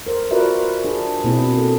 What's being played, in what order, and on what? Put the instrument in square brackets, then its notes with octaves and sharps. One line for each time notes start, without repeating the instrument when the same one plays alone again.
[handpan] A#4 C5
F4 F#4 A#4 B4 D5 E5
D4 G#4
B2 A#3 C4 E4 G#4
A4